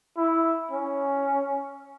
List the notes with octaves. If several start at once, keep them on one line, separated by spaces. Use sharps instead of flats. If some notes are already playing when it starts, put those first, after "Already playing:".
E4
C#4